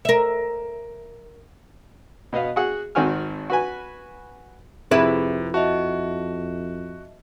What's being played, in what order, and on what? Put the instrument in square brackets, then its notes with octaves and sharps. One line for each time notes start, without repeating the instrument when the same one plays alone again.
[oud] A#4 E5
[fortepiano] B2 B3 D#5 F5
F#4 G#4 F#5
G#1 D#3 C4 F#4 G#5 F6
F#4 B4 G#5
[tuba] F2 [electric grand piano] C3 [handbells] C4 G#4 E5 [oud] E4 B4
[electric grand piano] F#4 [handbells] D#5 E5 A5